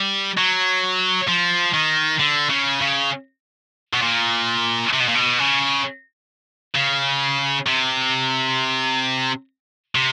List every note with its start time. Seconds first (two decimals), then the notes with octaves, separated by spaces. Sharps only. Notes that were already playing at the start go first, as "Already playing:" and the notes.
Already playing: G3
0.38 F#3
1.28 F3
1.74 D#3
2.19 D3
2.50 C#3
2.81 C#3
3.94 B2
4.02 A#2
4.93 C3
5.00 B2
5.08 A#2
5.15 B2
5.39 C#3
6.75 C#3
7.67 C3
9.95 C3